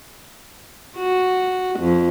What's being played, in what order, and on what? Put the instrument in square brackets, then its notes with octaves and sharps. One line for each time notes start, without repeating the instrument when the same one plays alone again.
[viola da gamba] F#4
F2